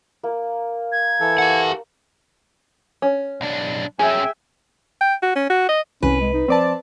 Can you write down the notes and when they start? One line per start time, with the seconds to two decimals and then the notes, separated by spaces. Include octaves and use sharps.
0.23 A#3
0.92 G#6
1.20 E3 A4
1.38 G4 F#5
3.02 C#4
3.41 B1 D4
3.99 F#2 C#4 G#4 E5 G5 G#5
5.01 G5
5.23 F#4
5.36 C#4
5.50 F#4
5.69 D#5
6.03 C2 C#4 B4
6.21 G#3
6.34 D#4
6.48 F3 C4 D5 A5